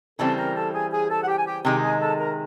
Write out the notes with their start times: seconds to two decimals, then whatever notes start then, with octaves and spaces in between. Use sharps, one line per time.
0.19 C#3 E3 G3 C4 A4 A5
0.38 A#4 A#5
0.55 A4 A5
0.74 G#4 G#5
0.91 G#4 G#5
1.10 A4 A5
1.22 F#5
1.28 G4 G5
1.38 G#5
1.46 G4 G5
1.64 C3 D#3 G#3 G4 G5
1.82 G#4 G#5
2.01 A4 A5
2.18 A#4 A#5